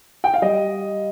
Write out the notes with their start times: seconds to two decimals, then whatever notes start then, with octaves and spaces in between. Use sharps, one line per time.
0.24 G5
0.34 F5
0.42 G3 D#5